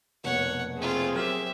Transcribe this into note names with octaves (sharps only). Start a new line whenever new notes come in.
F1 B2 A#3 C#5 F#5
A3 C4 F4 G#4
F#3 G4 A#4 E5 F6